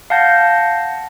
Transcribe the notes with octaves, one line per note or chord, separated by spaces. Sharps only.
F5 F#5 A5 G6 A#6